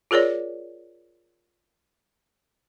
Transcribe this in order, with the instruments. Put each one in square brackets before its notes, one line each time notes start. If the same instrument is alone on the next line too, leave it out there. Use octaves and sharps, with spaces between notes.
[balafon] F4 G#4 A#4 C#5 D5